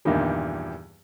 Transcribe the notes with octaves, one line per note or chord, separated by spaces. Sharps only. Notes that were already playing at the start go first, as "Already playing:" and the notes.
E2 G2 A#2 D3 D#3 G3